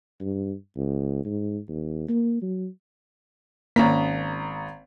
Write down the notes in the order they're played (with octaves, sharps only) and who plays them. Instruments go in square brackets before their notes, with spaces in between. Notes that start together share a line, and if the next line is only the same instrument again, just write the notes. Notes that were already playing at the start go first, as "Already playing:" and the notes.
[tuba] G2
C#2
G#2
D#2
A#3
F#3
[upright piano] G#1 A#5 B6 [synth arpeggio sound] A#3 C#4